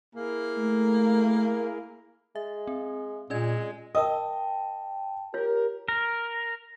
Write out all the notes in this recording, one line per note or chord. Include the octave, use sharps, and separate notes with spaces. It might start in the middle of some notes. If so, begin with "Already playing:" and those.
A#3 E4 G#4 A#4
A3
G#3 E5
C4
A#2 G#3 C#4 D5 G#6
A#4 D#5 G5 A5 D#6
F4 G4 A#4 C#5
A#4